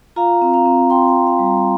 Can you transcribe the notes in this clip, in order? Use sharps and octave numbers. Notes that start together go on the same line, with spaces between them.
F4 F5 A#5
C4
F5 A#5
C4
F4 G5 C6
G5 C6
C4
F5 A#5
G3
F5 A#5